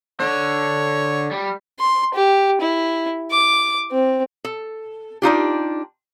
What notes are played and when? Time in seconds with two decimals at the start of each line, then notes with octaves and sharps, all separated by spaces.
0.20 D3 C#5
1.31 G3
1.79 C6
2.14 G4
2.61 E4
3.31 D6
3.91 C4
4.44 A4
5.22 D4 D#4 F4 G4